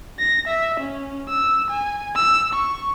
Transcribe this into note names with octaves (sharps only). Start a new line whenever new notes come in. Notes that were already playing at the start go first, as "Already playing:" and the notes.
A#6
E5
C#4
E6
G#5
E6
C#6